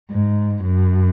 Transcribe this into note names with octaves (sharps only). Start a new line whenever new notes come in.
G#2
F#2